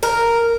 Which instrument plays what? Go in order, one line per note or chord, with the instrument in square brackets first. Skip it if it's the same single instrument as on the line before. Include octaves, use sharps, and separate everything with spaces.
[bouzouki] A#4